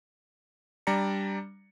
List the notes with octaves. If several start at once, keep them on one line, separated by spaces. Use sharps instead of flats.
G3 D4 D5 A#5 C#7